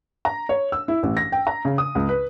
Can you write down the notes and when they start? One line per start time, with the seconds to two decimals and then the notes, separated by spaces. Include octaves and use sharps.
0.25 A#5
0.49 C#5
0.72 E6
0.88 E4
1.03 A1
1.17 A#6
1.32 G5
1.47 A#5
1.65 C#3
1.78 D#6
1.95 C#2
2.09 B4